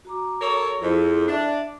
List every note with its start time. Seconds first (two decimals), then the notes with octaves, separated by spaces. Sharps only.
0.05 F#4 A#5 D6
0.41 A4 A#4 C#5
0.81 F2 E4 G#4 A4
1.28 D4 E5